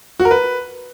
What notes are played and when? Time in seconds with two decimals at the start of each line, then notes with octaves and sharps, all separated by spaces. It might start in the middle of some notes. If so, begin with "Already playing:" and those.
0.20 F#4
0.25 A#4
0.31 B4